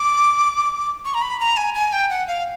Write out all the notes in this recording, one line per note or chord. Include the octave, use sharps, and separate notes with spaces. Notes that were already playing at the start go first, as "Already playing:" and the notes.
Already playing: D6
C#6
A#5
B5
A#5
G#5
G#5
G5
F#5
F5